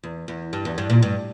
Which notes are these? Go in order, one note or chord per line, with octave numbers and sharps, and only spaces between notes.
E2
E2
G2
E2
G2
A#2
G2